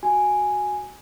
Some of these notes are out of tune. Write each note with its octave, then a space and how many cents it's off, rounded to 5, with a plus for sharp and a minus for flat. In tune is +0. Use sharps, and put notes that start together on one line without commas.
F#4 +0 G#5 +0